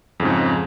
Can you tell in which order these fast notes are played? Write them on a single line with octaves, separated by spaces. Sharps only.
F2 C#3 G#2